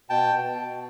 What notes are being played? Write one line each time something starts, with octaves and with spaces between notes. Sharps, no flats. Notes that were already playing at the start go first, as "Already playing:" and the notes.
B2 G5 A5
B2